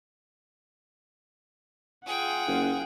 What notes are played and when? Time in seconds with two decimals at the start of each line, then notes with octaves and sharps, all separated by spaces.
2.06 F4 G#4 F#5 G5
2.48 F#1